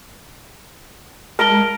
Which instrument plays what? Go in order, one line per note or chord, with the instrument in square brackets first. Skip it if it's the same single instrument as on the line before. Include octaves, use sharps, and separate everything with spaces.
[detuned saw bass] G#3 [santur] A#4 A5 A#5 [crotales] F6 D7 G7